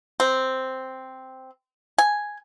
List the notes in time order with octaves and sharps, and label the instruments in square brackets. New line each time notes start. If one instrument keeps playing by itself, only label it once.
[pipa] C4
G#5